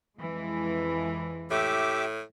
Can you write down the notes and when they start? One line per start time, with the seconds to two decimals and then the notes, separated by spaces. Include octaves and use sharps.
0.17 F2 E3 G#3
1.51 A2 G4 E5 D6